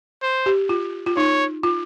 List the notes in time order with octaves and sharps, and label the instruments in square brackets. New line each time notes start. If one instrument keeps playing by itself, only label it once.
[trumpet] C5
[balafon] G4
F4
F4
[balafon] D#4 [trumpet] C#5
[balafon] F4